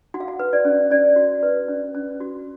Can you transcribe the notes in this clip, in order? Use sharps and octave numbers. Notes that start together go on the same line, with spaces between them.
F#4 F#5
F5
F#5
B4
D5
C#4
C#4 D5
F#4
B4
C#4
C#4
F#4